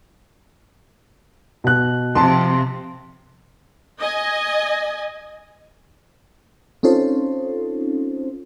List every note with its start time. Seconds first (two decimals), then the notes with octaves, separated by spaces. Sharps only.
1.64 B2 F#6
2.15 C3 F3 A5 C6
3.99 D#5 G#5
6.83 C4 C#4 D#4 F4 A4 C5